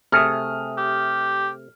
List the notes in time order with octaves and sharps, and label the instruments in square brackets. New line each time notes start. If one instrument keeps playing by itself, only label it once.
[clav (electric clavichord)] C3 A3 G#4 [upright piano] D#6 F6
[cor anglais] G4